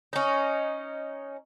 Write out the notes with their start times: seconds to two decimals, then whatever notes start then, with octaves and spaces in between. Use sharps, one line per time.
0.13 C#4 D#4